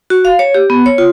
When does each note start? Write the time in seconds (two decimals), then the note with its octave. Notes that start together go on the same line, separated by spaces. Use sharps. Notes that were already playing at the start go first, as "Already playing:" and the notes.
0.10 F#4
0.25 F5
0.39 C#5
0.55 G4
0.70 B3
0.86 C#5
0.98 F4